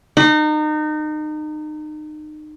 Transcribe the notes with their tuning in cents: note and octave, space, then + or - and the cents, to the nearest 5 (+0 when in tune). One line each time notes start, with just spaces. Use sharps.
D#4 -30